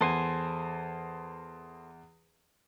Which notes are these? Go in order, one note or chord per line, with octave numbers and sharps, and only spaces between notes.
E2 A4 C5 G#5